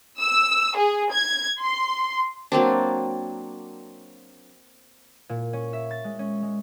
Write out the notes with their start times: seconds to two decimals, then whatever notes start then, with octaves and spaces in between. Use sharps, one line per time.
0.19 E6
0.76 G#4
1.12 G#6
1.60 C6
2.52 F#3 A#3 C4 D4
5.29 A#2
5.53 C#4
5.73 E5
5.91 A6
6.04 G#3
6.19 C#4
6.42 G#3